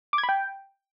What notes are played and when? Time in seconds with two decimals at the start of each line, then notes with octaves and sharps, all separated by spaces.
0.13 D6
0.18 G#6
0.23 B5
0.29 G5